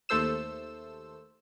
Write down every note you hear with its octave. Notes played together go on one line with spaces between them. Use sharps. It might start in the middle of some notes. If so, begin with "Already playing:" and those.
D#2 A3 A4 C5 E6 E7